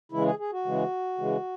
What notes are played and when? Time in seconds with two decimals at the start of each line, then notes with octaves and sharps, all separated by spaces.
0.12 C#3 E3 G#3 E4
0.26 G#4
0.39 G#4
0.52 F#4
0.65 C#3 E3 G#3
1.18 C#3 E3 G#3